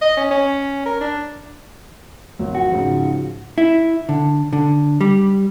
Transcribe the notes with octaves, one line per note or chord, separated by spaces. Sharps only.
D#5
C#4
C#4
A#4
D4
G#1 F3 F#3
F#4
G#2 C#3 F3
E4
D3
D3
G3